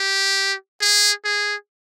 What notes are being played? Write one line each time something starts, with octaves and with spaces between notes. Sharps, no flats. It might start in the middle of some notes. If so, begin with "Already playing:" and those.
Already playing: G4
G#4
G#4